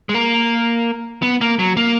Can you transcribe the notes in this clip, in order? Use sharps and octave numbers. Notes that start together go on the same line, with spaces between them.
G#3
A#3
B3
A#3
F#3
A#3